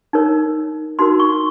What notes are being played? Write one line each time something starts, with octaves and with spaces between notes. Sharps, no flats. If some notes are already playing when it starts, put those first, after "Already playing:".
D#4 A#4 C#5
D#4 F#4 A#4 C6
C#6